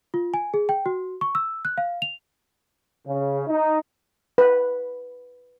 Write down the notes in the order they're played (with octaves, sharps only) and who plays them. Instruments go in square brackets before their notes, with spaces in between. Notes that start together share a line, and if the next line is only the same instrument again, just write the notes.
[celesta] F4
G#5
G#4
G5
F#4
C#6
E6
F#6
F5
F7
[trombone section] C#3
D#4
[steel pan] B4